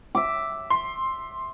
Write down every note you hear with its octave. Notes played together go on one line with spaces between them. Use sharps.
E5 D6
C6